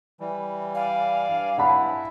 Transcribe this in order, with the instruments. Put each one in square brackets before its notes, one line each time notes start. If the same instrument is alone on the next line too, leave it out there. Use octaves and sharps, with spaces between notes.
[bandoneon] E3 G3
[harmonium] D5 G#5 [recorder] F5
[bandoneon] G2
[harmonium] E4 [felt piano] F#5 A5 B5